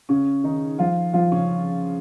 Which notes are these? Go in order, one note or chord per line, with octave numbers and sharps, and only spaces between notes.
C#3 C#4
D#3 D#4
F3 F4
F3 F4
C#3 C#4